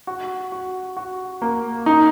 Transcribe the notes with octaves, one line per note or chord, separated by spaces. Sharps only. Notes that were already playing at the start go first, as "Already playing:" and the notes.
F#4
F#4
F#4
A#3
D#4